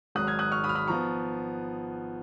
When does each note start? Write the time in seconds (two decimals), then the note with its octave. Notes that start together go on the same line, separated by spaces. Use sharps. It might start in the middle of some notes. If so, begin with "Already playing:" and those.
0.15 G#1 G#2 F#3 D#6 F#6
0.27 F6 G#6
0.39 D#6 F#6
0.52 C#6 F6
0.64 B5 D#6
0.69 F6
0.75 B5 D#6
0.87 F3 B3 A#5 C#6